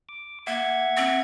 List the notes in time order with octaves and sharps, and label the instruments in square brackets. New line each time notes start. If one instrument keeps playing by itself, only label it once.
[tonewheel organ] D6
[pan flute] A#3 [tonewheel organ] E5 F#5 G#6
[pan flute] C4